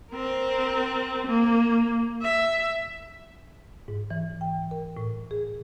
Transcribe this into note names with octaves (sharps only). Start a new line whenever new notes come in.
C4 A#4
A#3
E5
G#2
E3
G5
A#4
A2
G#4